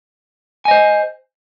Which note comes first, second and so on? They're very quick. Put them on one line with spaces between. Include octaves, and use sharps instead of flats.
G#5 D#5 C5